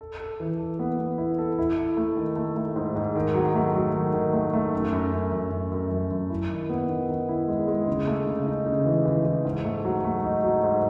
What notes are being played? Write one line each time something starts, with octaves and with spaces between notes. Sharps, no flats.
A4
A4
E3
A4
B3
B3
E4
A4
E4
E4
A3
D#3
A3
A3
G#2
G#2
D#3
F#3
A3
F#3
D#3
D#3
A3
A3
F#2
F#2
F#2
F#2
F#2
F#2
F#2
F#2
E4
D#3
B3
D#3
D#3
E4
G#3
G#3
C#3
A3
C#3
D#4
C#3
E3
E3
E3
G#2
A3
F#3
A3
D#4
F#3
G#2